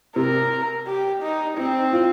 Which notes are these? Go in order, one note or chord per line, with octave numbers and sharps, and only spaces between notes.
C3 A#4
G4
D#4
C4 D#4
F4